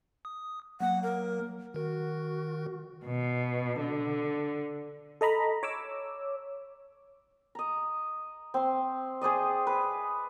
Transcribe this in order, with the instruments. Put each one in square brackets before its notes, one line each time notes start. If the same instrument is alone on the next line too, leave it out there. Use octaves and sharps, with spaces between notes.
[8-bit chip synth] D#6
[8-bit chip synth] F#3 A#3 [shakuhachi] F#5
[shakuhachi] A#4
[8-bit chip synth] D#3 A#4 [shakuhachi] F#4
[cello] B2
D3
[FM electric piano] A4 D#5 A#5 B5
C#5 D6 E6
[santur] D#5 A#5
C4 C6
G#4 C5 D5 D#5
B4